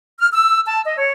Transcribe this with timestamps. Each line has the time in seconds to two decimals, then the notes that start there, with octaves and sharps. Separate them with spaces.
0.18 F6
0.32 E6
0.66 A5
0.84 D#5
0.97 C#5